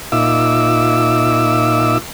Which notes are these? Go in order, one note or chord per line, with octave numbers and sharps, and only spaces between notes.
A#2 D#4 F4 E5 D6 E6